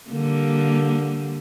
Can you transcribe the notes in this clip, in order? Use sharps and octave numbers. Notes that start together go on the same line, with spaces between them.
D3 G3 A#3